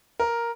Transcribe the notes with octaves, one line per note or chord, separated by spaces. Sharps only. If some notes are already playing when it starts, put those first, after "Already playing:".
A#4